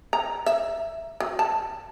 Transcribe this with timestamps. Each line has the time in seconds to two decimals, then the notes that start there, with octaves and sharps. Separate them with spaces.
0.13 A#5
0.46 E5
1.20 F#3
1.39 A5